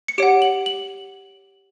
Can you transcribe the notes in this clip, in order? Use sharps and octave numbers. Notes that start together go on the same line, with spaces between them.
C#7
G4 C#5 F#5 D7
F#7
F#7